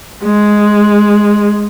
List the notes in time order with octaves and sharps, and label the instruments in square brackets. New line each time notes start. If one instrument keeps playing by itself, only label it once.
[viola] G#3